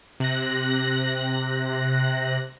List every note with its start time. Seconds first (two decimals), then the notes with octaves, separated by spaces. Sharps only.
0.20 C3 F#6 A#6